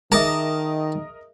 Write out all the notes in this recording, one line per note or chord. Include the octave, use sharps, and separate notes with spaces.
D#3 G#4 A#4 D#5 E5 A5 D#6